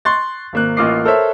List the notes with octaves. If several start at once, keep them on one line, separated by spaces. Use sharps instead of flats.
C6 C#6 F#6 A6
G#1 A#3 F#6
A1 A#3 F4 D#5 D6 C7
A4 A#4 C5 C#5 E5